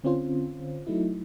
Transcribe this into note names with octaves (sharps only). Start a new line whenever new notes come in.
D3 C4 C#4 F4 C5
F#3 A3 D#4 E4